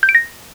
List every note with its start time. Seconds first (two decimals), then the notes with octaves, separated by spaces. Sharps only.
0.03 G6
0.09 D7
0.15 A#6